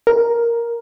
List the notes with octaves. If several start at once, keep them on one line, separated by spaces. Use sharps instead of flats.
A#4